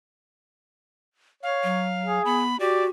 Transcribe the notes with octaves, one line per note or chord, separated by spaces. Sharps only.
C#5 F5
F#3
G#4
B3 B5
F#4 G4 D5